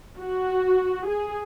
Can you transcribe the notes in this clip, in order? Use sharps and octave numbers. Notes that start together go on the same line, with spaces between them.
F#4
G#4